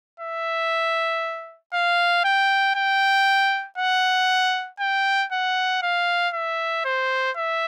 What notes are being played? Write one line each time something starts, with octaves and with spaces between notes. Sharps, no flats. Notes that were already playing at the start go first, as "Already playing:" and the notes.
E5
F5
G5
G5
F#5
G5
F#5
F5
E5
C5
E5